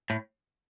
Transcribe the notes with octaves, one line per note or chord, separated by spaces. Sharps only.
A2